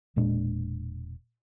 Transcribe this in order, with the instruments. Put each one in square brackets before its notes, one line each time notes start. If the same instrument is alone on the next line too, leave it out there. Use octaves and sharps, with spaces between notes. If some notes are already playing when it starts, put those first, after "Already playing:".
[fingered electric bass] E1 A#2 G#3 D4